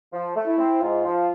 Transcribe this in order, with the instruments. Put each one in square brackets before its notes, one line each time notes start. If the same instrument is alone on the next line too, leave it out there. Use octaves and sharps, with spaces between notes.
[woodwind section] F3
A3
[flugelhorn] E4
[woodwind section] C4
[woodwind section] G#2 [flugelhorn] F4
[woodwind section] F3